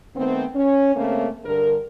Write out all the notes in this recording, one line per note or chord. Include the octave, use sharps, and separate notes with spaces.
D#3 A3 B3 C4
C#4
C#3 A3 A#3 C4 C#4
G2 D3 A#4